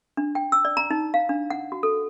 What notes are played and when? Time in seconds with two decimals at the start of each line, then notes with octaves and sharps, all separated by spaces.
0.17 D4
0.35 G5
0.52 E6
0.65 D5
0.77 A#5
0.91 D#4
1.14 F5
1.29 D4
1.50 F#5
1.72 F#4
1.83 A4